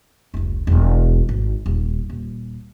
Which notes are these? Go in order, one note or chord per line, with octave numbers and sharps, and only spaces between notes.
F1 C#2
E1 G#3
G#1
D#1 D#2
D#1